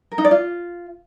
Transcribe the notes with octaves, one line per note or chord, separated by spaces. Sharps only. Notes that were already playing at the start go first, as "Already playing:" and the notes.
A#4
D#4
D5
F4